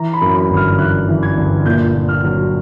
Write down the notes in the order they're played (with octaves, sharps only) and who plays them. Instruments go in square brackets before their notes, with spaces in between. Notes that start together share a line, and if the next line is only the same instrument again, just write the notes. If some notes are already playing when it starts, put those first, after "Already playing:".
Already playing: [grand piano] E3 A#5
B5
F#2
B5
G1
F6
E3 F#6
E3
G#6
G1
A#2 G6
A#2
F6
F#3